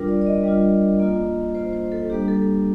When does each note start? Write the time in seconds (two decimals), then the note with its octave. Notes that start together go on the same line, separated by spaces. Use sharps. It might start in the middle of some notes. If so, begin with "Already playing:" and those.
Already playing: G3 D4 F4 A#4
0.08 D5
0.22 D5
0.26 D#5
0.44 G3 D4 F4
1.00 A#3 F4
1.54 A#3 F4 C5
1.73 C5
1.92 A4
2.10 G3 A#3 D4 G4
2.28 A4